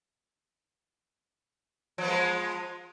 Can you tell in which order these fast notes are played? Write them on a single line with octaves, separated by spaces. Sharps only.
F3 B3 G#3